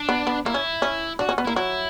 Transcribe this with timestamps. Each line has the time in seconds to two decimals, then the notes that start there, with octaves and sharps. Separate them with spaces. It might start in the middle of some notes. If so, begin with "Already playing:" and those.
Already playing: D4
0.09 B3
0.27 B3
0.46 A#3 E4
0.54 C#4
0.82 C#4
1.19 D4 F#4
1.29 C#4
1.38 B3
1.45 E4
1.47 A#3
1.56 F#3 E4